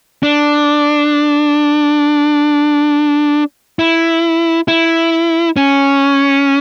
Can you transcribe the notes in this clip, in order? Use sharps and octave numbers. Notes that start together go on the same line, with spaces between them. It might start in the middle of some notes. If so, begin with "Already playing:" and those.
D4
E4
E4
C#4